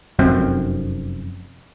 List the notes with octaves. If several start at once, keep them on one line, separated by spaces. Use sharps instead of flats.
F1 F#2 C4